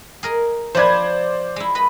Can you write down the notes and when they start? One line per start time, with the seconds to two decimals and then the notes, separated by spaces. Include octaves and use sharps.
0.23 G#4 A#4 D#5
0.75 F3 B4 C5 D5 G#6
1.56 G#3 E4
1.75 B4 D#5 B5